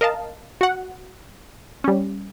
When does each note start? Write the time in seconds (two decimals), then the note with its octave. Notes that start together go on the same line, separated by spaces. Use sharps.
0.01 A#4 D#5 F5 A5
0.61 F#4 F#5
1.84 G3 C#4